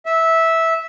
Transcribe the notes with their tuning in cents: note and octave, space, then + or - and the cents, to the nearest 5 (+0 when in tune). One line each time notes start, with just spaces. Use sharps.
E5 -10